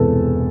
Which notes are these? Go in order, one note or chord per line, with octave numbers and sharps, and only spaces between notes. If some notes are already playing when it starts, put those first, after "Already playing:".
Already playing: E1 E2 C3 A4 B4